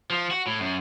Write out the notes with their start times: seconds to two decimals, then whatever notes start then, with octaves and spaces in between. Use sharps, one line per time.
0.10 F3
0.31 F#4
0.47 A2
0.60 F#2